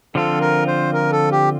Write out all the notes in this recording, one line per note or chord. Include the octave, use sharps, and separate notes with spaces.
D3 F3 C4 F4 A4
A#4
C5
A#4
A4
G4